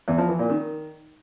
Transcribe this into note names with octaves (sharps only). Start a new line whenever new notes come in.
E2
F3
E3
A#2
D#3